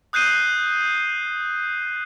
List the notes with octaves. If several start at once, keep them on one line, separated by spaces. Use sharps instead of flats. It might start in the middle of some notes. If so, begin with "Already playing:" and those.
D#6 F#6 G6 C7 D#7 G7